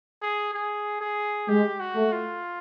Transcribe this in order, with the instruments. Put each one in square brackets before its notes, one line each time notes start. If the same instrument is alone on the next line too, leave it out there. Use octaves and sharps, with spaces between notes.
[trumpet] G#4
G#4
G#4
[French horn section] G#3 [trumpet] G4
[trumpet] F#4
[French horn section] A3
[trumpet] F4